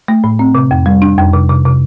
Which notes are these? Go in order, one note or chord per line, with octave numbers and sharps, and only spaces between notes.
A3
A2
C4
C3
F2
G3
D4
F2
C3
C3
C3